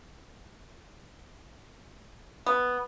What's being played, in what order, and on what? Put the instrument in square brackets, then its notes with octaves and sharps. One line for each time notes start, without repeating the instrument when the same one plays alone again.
[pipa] B3